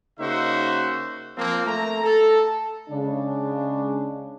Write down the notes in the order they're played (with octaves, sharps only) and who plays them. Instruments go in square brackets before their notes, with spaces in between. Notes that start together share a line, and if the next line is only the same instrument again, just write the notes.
[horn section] C#3 A#3 D#4 F#4 C5 E5
F3 A#3 C4
A3 A#5
A4
[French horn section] C#3 G#3 D4